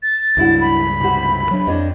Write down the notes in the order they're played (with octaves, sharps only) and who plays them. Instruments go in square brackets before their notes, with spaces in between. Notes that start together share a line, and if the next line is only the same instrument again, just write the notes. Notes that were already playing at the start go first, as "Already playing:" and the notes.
[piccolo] A6
[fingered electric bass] C#2 G2 [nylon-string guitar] D4 E4 F#4
[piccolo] B5
[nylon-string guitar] C3 F#4
[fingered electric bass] F#3 D4
[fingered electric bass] F2 [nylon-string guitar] D4 C#5 D#5